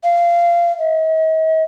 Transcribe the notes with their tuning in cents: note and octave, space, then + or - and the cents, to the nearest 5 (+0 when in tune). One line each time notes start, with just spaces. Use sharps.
F5 -20
D#5 +45